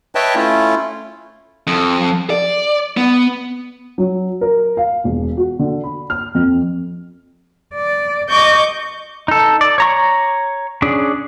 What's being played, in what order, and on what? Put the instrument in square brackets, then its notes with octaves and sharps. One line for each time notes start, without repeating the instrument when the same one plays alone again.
[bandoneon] B4 C#5 D#5 E5 G5 A5
A3 C#4 E4 F4
[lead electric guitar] F2
D5
B3
[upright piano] F#3
A#4
F5
E1
F#4
D3
B5
F6
F2
[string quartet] D5
D#5 C#6 D6 G6
[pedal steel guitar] D#4 A4
D5
C#5 A#5 C#6
C#4 D4 G#4